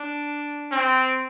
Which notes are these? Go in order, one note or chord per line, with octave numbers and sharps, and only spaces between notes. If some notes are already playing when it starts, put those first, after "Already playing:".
Already playing: D4
C4